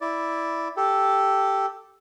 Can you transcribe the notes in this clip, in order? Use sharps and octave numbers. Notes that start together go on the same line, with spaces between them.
E4 D5
G4 A4